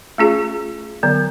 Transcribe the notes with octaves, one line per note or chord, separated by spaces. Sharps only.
A3 C#4 F4 G#4
D3 F#3 B3